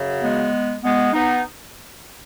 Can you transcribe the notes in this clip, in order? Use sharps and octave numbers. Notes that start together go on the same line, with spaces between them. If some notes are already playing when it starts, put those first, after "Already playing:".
Already playing: F#2 C#3 F#3
G#3 B3
G#3 B3
B3 D#4